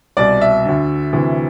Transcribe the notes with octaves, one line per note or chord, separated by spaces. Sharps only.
C2 B2 D5
E5
D2 D3
D2 C3 E3